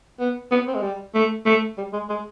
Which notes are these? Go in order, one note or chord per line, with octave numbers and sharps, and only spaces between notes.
B3
B3
C4
G#3
G3
A3
A3
G3
G#3
G#3